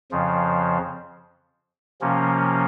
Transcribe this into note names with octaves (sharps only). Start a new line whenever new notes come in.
F2 C#3 F3
C3 F3 A#3 C#4